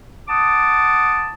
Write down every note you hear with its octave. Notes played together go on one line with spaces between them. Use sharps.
F#5 A5 D6 D#6